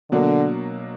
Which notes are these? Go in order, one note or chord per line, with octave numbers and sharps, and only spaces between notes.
B2 D3 F#3 A#3 D4